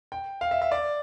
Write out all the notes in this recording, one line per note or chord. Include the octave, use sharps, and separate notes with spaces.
G5
F5
E5
E5
D5